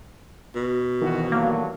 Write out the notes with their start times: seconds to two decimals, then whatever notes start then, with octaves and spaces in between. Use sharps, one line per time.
0.55 B2
1.02 A#1 F2 D#3 E3 F#4
1.32 G2 F#3 A3 A#3